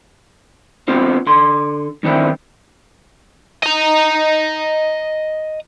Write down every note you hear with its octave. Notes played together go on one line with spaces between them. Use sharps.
B3 C4 D4 F4 C5
D3 C6
G2 D#3 C4 D4 E4
D#5 A#5